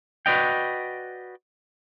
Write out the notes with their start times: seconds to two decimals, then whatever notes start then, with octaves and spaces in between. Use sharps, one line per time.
0.26 F#4 B4 D5 D#5 G5